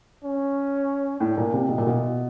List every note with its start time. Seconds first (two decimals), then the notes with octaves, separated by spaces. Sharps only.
0.24 C#4
1.20 A2 D4
1.37 A#2
1.54 C3
1.69 B2 E4
1.78 A#2
1.87 B2